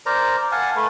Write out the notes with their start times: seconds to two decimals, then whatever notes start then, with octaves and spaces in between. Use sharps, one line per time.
0.06 A#4 C5 D5 A#5
0.52 F5 F#5 G#5 A5
0.76 A3 B4